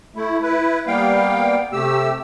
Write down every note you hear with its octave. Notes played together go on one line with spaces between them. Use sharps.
A3 E4
E4 B4
G3 A#3 B3 F5 G5
C3 A3 G4 E6